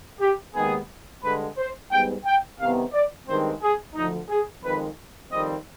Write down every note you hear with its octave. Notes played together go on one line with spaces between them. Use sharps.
G4
D#2 D#3 G#3 B3 G#4
G2 D3 G#3 B4
C5
G#2 G3 B3 G5
G5
C2 C3 D#3 B3 F5
D5
G2 D#3 G#3 C4 C5
G#4
D2 D3 F3 D#4
G#4
F2 D#3 G#3 B4
F2 D#3 G3 C4 D#5